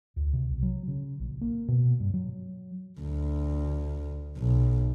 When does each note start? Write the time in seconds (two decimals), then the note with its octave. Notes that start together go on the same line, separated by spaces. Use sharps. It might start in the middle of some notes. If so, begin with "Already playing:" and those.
0.16 D2
0.33 C3
0.49 B1
0.63 F#3
0.88 C#3
1.20 A#1
1.41 A#3
1.68 B2
2.00 G2
2.14 F#3
3.00 D2
4.37 B1